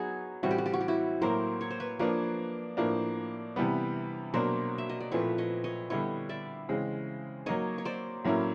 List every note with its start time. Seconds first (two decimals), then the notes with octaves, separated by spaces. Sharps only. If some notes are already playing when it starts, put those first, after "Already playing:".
Already playing: F#3 B3 D#4 F#4 G#4
0.43 A2 E3 G3 C4 F#4
0.51 G4
0.58 F#4
0.66 G4
0.73 F#4
0.81 G4
0.88 E4 F#4
1.21 A2 F#3 A#3 A#4 C5
1.61 C#5
1.70 C5
1.80 B4 C#5
1.99 F3 A#3 D4 B4 C#5
2.77 A2 F3 A#3 D4
3.56 C3 E3 G3 B3
4.34 B2 F#3 A#3 D4 A#4 C5
4.78 E5
4.89 D#5
5.00 D5
5.12 A#2 F3 A3 C4 E4 B4 C#5
5.38 C#5 D#5
5.64 C#5 D#5
5.90 D3 G3 B3 E4 C#5 D#5
6.29 D5 E5
6.69 C#3 E3 G#3 C4
7.46 F#3 A#3 D#4 C#5 D#5
7.78 C#5
7.85 C5 D5
8.24 A2 F#3 A#3 C#4 E4